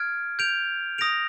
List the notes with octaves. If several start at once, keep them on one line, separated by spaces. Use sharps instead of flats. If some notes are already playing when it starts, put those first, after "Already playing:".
Already playing: F6 G#6 D7
G6 D7 F7
D#6 A#6 D7 F7